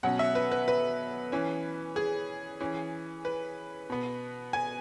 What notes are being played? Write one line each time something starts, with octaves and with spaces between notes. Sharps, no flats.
B2 F#3 C#4 F#5
E5
B4
B4
B4
E3 C#4
G#4
E3 C#4
B4
B2 B3
G#5